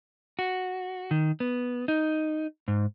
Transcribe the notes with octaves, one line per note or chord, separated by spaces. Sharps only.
F#4
D#3
B3
D#4
G#2